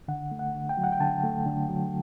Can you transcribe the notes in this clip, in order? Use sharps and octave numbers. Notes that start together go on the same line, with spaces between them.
D3 F#5
A3
F#5
D3
G5
F#3
F#5
G5
D3 A5
A3
D3
F#3